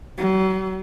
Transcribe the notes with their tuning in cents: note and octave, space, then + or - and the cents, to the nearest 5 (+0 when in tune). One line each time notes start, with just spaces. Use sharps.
F#3 +40